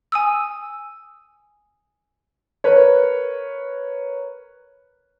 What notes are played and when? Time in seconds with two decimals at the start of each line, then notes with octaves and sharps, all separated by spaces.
0.12 G#5 D#6 E6
2.64 A#4 B4 C#5